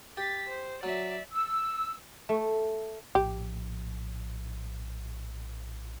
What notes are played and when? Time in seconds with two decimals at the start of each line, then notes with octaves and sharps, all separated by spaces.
0.17 G4 A6 B6
0.48 C5
0.83 F#3 D5 E5
1.31 E6
2.29 A3
3.15 A#1 A2 F3 G4